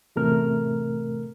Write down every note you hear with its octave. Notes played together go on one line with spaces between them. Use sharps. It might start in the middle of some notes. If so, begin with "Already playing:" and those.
E2 A2 C3 A3 A#4 F6